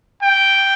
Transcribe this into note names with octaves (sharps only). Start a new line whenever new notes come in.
G5